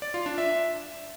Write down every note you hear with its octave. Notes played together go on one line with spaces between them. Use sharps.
D5
F4
D4
E5